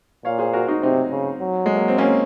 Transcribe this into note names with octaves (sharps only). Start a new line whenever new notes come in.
A#2 C#5 F5
G#4 C5
F#4 A#4
D#4 F#4
C3 C4 D#4
C#3
F#3
G#3
A#3
C4
A#3 C#4